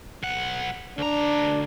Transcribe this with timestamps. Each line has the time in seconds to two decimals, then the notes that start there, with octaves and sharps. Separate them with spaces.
0.23 B1 F#5
0.98 D2 D4 A#5